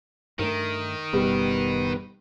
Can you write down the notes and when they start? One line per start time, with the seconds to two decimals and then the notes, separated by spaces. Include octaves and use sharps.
0.39 G2 D#3 A3 A#4
1.13 F#1 B2 G3 B3 B4